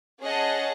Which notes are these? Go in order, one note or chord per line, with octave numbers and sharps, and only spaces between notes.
C#4 G#4 D#5 F#5 A5